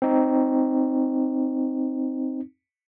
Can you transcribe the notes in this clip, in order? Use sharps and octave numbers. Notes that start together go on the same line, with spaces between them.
C4 D#4